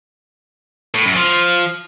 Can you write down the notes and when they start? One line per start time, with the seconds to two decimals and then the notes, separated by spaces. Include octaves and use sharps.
0.94 A2
1.05 F#2
1.16 F3